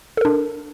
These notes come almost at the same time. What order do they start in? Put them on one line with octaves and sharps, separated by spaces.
A4 A#4 D4